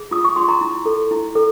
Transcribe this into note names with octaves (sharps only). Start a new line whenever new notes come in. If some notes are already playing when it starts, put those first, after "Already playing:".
Already playing: G#4
F4 D#6
C#6
F4 C6
A#5
E4
A4
E4
A4